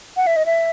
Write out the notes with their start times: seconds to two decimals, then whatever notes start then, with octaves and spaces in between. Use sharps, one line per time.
0.17 F#5
0.27 E5
0.36 D#5
0.46 E5